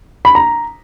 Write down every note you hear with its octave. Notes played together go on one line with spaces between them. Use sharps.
B5
A#5